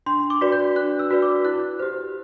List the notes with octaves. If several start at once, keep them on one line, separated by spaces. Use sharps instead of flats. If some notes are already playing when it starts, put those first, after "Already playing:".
D4 C6
D6
F#4 B4 D5
G6
D4 F#6
E6
F#4 B4 D5
D6
E4 F#6
G4 C5